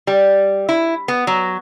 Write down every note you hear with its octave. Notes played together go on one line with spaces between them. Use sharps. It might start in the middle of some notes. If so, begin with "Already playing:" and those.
G3
E4
B3
F#3